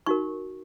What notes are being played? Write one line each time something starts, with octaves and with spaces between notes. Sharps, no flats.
D#4 F#4 A#4 C#6